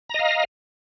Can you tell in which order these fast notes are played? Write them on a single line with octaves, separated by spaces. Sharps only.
A#5 D#5 F5